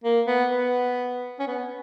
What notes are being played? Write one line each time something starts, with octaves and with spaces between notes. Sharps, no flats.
A#3
B3
B3
C#4
B3